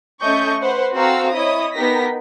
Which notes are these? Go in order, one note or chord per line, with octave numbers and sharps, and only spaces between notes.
A3 C#4 D#5 C#6 G6
B4 C5 F#5
C4 F#4 A4 F5 A#5 E6
E4 C#5 D#5 D#6
B3 D#4 G4 A#4 A#6 B6